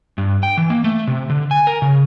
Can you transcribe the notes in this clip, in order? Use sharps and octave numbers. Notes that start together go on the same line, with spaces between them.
G2
G5
E3
A#3
A3
C3
D3
G#5
A#4
C#3